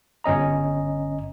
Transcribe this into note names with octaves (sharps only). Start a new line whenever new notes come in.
G1 C#4 D#5 A#5